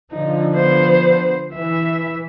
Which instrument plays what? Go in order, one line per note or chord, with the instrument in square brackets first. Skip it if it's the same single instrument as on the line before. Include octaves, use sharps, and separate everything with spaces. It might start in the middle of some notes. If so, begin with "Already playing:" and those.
[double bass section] D3 F3 [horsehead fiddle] D#4
[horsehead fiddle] B3 C5
[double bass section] E3 [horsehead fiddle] E5